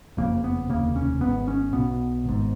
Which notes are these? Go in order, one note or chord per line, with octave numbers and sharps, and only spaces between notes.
F#1 F2 C#3 A#3
B3
F1 D#2 C#3 A#3
C#4
G#1 G#2 B3
C#4
B1 B2 B3
G#1 G#2